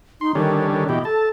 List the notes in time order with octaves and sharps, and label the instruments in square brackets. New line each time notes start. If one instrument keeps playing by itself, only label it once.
[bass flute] D#4 [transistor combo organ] C6
[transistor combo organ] D3 G3 C#4 [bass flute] D#3
[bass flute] D#3
[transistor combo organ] B2 E3 G4 [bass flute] D#5
[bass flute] A4 [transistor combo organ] A5